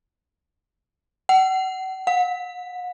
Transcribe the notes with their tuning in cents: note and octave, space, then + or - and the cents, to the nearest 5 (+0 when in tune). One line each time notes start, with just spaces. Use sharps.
F#5 +35
F#5 -45